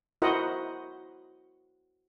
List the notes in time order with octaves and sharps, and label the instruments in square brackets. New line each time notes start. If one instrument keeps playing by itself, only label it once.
[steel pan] E4 F#4 A#4 C5 D#5 F#5